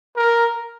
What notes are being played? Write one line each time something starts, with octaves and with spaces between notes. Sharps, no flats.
A#4